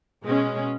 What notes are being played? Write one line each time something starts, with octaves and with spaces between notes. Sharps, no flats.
B2 G#3 C#4